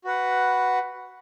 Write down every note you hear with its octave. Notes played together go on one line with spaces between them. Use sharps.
F#4 B4 F#5